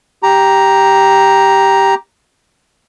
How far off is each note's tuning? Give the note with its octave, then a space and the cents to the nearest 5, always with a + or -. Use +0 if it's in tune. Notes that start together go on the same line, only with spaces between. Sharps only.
G4 +0 A#5 +5